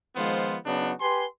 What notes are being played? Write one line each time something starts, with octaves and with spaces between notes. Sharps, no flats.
D#3 F3 G#3 B3 F4 C5
C#3 F#3 B3 D4 D#4 F#4
G4 B4 G#5 C6